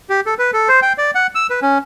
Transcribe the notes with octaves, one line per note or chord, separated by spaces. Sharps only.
G4
A4
B4
A4
C5
G5
D5
F#5
E6
B4
C#4